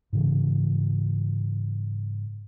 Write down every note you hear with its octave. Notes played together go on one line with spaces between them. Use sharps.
G#2 C#3 E3